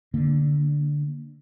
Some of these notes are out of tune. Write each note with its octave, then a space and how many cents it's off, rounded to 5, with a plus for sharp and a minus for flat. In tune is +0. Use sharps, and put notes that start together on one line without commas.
D3 +0 A#3 +0